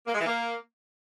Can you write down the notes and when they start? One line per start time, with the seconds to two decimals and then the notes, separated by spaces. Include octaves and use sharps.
0.06 A#3
0.13 G#3
0.19 E3
0.26 A#3